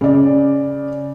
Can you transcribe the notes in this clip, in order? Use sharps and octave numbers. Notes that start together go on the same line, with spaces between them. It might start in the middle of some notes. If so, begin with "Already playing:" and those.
C#3 D5